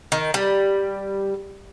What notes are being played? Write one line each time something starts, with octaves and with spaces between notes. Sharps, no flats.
D#3
G3